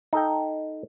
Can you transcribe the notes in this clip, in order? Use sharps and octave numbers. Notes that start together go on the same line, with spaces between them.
D#4 A4 G5